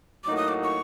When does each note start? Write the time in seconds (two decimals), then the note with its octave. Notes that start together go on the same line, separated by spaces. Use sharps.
0.24 A2 F#3 A#3 D#4 F#4 D6
0.37 D#6
0.48 D6
0.64 C#6